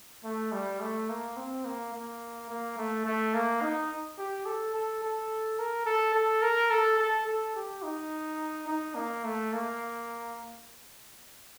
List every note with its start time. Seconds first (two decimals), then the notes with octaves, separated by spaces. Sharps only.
0.24 A3
0.52 G3
0.80 A3
1.09 A#3
1.37 C4
1.65 A#3
1.93 A#3
2.49 A#3
2.77 A3
3.05 A3
3.34 A#3
3.62 D#4
4.18 G4
4.46 A4
4.74 A4
5.03 A4
5.59 A#4
5.86 A4
6.15 A4
6.42 A#4
6.71 A4
6.99 A4
7.26 A4
7.56 G4
7.83 D#4
8.67 D#4
8.95 A#3
9.24 A3
9.52 A#3